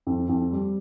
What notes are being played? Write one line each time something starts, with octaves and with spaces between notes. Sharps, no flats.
F2
F2
G3